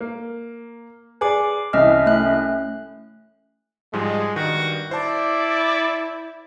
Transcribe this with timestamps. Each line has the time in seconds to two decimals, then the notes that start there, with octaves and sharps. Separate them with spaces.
0.01 A#3
1.21 G#4 B4 D5 D6
1.73 C2 E3 C#4 D#5 F6
2.06 A3 C#4 F#6
3.93 G#2 F3 G3 G#3
4.36 G2 D#3 F#4
4.91 E4 C5 D5 A5